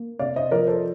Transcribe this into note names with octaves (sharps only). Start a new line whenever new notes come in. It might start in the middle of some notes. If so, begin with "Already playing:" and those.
Already playing: A#3
C3 D5 F5
C5 D#5
F3 A#4 D5
A4 C5